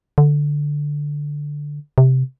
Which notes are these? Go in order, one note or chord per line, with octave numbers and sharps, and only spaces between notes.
D3
C3